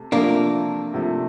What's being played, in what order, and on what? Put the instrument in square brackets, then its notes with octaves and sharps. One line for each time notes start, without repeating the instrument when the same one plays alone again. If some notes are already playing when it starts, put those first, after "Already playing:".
Already playing: [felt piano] C3 A3
[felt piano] C3 F3 A3 [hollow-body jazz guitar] A#3 D4
[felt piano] C3 F3 A3